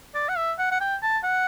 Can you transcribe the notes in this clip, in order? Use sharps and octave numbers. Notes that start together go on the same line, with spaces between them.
D5
F#5
E5
F#5
F#5
G5
A5
F#5